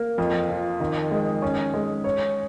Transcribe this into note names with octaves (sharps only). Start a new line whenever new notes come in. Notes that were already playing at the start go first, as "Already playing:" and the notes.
Already playing: A#3
F2
F3
D#3
G#3
C#4
G#3
C#5